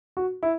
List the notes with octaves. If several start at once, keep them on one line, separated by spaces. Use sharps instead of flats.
F#4
E4